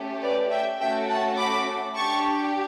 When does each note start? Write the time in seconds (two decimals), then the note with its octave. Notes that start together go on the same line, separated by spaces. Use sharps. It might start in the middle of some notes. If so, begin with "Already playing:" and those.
Already playing: A3 C#4 G4
0.22 B4 D5
0.51 E5 G5
0.79 A3 C#4 F#4 A4 E5 G5
1.08 F#5 A5
1.37 B5 D6
1.94 D4 G4 A5 C#6